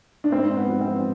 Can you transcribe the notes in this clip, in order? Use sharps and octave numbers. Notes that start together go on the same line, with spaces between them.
D4
G#2 C4
B3
F3
C4